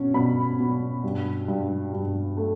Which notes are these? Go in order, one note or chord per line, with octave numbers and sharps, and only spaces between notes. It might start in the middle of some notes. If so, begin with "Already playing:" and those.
Already playing: B2 C#4
B2 B5
B2
G2
G2
G2
A3